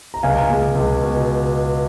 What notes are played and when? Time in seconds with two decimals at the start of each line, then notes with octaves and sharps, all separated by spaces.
0.14 A#5
0.23 C#2 F5 G#5
0.50 G#3
0.75 C#2
1.02 B2